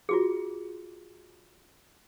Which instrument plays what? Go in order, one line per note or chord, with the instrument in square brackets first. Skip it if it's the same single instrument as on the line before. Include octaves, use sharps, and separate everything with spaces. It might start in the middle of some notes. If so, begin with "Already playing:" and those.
[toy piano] F4 F#4 G#4